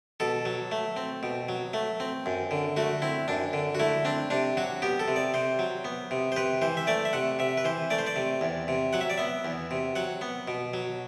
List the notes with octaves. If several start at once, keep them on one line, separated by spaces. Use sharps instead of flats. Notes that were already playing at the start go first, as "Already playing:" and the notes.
B2 A4
F#3
A3
C4
B2
F#3
A3
C4
F#2
D3
A3 F#4
C4 E4
F#2 D4
D3
F#4
A3 E4
C4 D4
C3 D4
F#3 F#4
B3 G4
A4
C3
D5
C3 C5
F#3
B3
C3
C5
C3 B4
E3 C5
E5
A3 D5
E5
C3 F#5
C3 E5
B4
E3 C5
A3 D5
C5
D5
C3
E2
C3
F#3 F#5
E5
D5
B3 E5
E2
C3
F#3 F#5
B3
B2
F#3